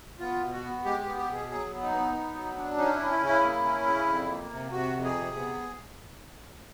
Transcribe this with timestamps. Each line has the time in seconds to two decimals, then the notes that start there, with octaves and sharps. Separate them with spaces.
0.20 B3 F4
0.41 B2
0.52 F#4
0.63 B3
0.85 G#3 G4
1.01 G4
1.06 B3
1.17 G4
1.28 B2 G#4
1.49 F#3 G#4
1.71 B3
1.82 D#4
1.92 B3
2.14 B3
2.35 F#3
2.57 D4
2.78 C#4 D#4
2.94 E4
2.99 C#4
3.11 E4
3.21 C#3
3.26 E4
3.42 A#3
3.64 C#4
3.86 C#3
4.07 F2
4.29 A#3
4.51 C3
4.72 C3 F#4
4.93 F2
5.04 G#4
5.15 C3
5.37 B3